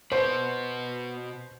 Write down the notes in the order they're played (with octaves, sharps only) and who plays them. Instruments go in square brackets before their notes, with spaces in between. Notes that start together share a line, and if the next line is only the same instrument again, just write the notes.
[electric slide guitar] B2 B4 [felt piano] C5